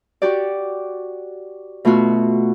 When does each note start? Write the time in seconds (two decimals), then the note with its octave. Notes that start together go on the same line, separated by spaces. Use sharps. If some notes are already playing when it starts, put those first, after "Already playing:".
0.22 F#4 G4 D5
1.85 B2 A3 B3 F4 F#4